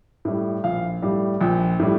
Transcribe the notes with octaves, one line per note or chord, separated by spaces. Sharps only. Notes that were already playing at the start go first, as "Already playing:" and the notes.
A2 G3
A#1 F5
A2 G3
A#1 G5
A2 G3